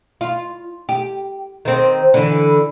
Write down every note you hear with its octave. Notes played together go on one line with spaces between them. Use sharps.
F4
G4
D#3 C4
D3 E3